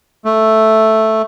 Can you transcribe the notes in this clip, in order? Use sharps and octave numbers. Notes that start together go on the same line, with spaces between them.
A3